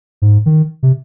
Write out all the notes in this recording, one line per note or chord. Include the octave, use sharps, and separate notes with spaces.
G#2
D#3
C3